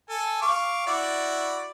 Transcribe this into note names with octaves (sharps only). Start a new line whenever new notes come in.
A4 G#5
F5 C#6 D6
E4 F#4 D5